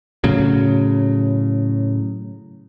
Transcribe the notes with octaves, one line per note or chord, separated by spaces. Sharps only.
A2 C#3 F#3